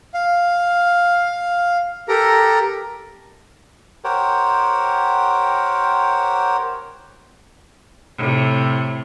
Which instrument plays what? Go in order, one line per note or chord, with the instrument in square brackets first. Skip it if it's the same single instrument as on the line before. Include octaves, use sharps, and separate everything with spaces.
[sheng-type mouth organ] F5
G4 A4 A#4 A#5
[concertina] G4 A#4 C5 C#5 F#5 G5
[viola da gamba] A2 C3